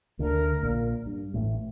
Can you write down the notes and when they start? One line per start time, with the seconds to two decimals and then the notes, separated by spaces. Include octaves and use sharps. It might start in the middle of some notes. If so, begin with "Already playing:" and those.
0.19 D2 D3 A#4
0.62 A#1 A#2
1.06 G2
1.34 A1 A2